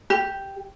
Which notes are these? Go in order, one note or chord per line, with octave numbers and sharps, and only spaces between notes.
G4